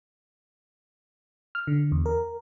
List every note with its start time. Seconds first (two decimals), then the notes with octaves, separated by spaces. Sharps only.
1.55 F6
1.67 D3
1.92 E2
2.06 A#4